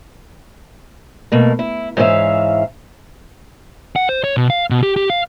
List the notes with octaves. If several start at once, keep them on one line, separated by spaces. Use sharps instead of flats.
B2 A3 A#3
E4
G#2 E3 C#4 G4 E5 F5
F#5
C5
C#5
B2
F5
B2
G4
G4
F5